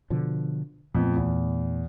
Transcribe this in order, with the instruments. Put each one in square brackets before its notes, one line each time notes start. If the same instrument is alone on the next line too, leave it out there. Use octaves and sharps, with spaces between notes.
[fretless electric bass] B2 D3 F3
[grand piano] F2 [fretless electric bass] A#2 A3 B3
[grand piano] E2